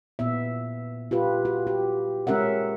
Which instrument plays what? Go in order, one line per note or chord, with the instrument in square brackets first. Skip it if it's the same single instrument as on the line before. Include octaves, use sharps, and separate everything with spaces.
[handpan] A#2 B3 E5
F4 G4 B4
F#4
G4
G#3 C#4 A#4 E5 F#5